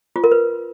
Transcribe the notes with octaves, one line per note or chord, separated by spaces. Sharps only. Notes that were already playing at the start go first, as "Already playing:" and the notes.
F4
A#4
B4